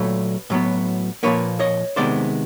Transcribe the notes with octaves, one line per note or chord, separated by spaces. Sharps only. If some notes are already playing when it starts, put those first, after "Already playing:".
Already playing: A#2 F#3 A3 B4 C#5
A2 F#3 B3
A#2 F3 A#3 B4 C#5
C#5 D#5
C3 D#3 G#3 B3 C5 D5